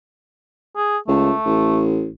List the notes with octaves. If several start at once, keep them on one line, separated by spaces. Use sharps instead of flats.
G#4
C#2 A3
A1